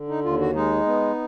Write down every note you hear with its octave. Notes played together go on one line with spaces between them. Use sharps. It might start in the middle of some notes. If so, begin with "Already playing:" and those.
Already playing: D3
D#4
D#2 F4
F#4
G#3 D#4
B3